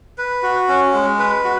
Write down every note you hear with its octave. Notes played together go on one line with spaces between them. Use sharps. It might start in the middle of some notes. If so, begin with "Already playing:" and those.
B4
F#4
C#4
G#3
B4
F#4